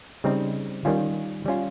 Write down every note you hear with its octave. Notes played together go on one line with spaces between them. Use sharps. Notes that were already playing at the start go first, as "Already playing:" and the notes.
C#3 G3 C4 D#4
D#3 G3 C#4 F4
G3 C#4 F4